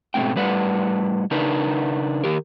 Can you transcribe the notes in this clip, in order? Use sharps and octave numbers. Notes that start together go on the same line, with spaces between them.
G#2 B2 A3 A#3 C4 G5
A2 G3 B4 D5 F#5
C#3 D4 D#4 A#4 B4
D#3 G4 A#4